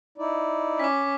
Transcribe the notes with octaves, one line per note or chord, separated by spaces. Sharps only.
D#4 E4 D5
C#4 D6 B6